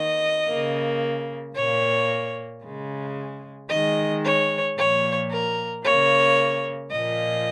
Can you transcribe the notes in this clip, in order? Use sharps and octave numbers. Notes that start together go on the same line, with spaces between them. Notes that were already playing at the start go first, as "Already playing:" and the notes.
Already playing: D#3 A#3 D#5
C#3 A#3
A#2 A#3 C#5
C#3 G#3
D#3 G#3 D#5
C#5
A#2 F3 A#3 C#5
A#4
C#3 A#3 C#5
A#2 F3 A#3 D#5